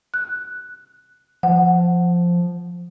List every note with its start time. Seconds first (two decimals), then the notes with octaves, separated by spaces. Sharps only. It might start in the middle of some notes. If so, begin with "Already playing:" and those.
0.14 F#6
1.43 F3 F#5